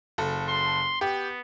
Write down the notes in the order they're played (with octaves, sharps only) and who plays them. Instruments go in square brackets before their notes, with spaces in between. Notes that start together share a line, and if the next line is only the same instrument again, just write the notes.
[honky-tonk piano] F#1 A4
[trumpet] C6
[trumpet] B3 [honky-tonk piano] G4